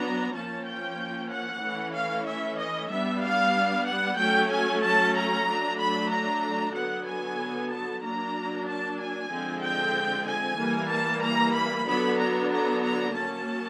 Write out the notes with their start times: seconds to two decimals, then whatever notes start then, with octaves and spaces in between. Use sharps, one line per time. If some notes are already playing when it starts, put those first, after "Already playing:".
Already playing: F#3 B3 D4 A#5
0.34 F3 A#3 C#4 A5
0.66 G5
1.30 F#5
1.62 E3 A3 C#4
1.94 F5
2.26 E5
2.58 D#5
2.90 G3 B3 D4 E5
3.22 F5
3.86 F#5
4.18 F#3 A3 C#4 G5
4.50 G#5
4.82 A5
5.15 A#5
5.46 F#3 A3 D4
5.78 B5
6.10 A#5
6.74 D3 F#3 B3 F#5
7.06 G#5
7.70 A5
8.02 F#3 A#3 D4 A#5
8.66 A5
8.98 G#5
9.30 D3 F3 G#3 C4
9.62 G5
10.26 G#5
10.58 E3 G3 A#3
10.90 A5
11.22 A#5
11.54 B5
11.86 D3 F#3 B3 D4 B5
12.18 A#5
12.50 A#5
12.82 A#5
13.13 F#3 A#3 C#4 A5